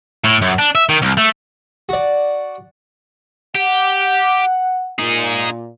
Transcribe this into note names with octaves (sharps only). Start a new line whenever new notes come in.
A2
F#2
D4
E5
D#3
C2
A3
F#4 D5
G4 F#5
A#2 D#4 G#4